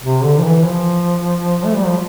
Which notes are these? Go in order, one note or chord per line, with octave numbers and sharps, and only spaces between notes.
C3
D3
F3
E3
F3
A3
G3
F3